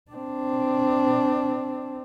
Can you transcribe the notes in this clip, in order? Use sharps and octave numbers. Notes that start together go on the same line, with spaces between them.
C4 D4